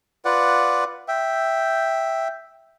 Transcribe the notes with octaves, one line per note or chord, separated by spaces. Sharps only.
F4 B4 D5 F#5
E5 G5